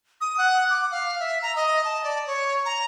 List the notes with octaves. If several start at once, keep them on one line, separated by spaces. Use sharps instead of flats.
D#6
F#5
D6
F5
E5
A#5
D#5
A5
D5
C#5
A#5